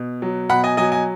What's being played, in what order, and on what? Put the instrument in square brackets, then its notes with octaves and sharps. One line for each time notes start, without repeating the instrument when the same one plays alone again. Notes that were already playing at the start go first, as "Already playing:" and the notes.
Already playing: [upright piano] B2
F#3
B2 F#5 B5
D#5 G#5
F#3 D#5 G#5
D#5 G#5